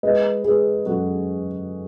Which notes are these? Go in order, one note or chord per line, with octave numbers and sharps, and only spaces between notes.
G#3 B4 D#5
G#3 G#4 B4
F#2 F#4 A4